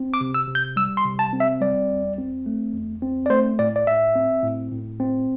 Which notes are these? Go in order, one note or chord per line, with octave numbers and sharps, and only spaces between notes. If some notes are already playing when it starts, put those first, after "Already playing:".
Already playing: C4
D6
C3
E6
C3
G6
G3 E6
C6
C3
A5
C4
E5
G3 D5
E2
C4
A3
E2
C4
D5
A3 C5
A2 D5
D5
A2 E5
C4
A2
A2
C4